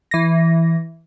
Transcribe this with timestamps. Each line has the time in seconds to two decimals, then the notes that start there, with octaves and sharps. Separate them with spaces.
0.11 E3 A#6